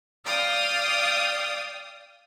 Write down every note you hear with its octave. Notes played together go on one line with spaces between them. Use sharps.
D5 F5 G5 D#6